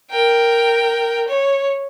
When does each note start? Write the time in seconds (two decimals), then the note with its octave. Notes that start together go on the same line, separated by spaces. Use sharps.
0.11 A#4 G5
1.28 C#5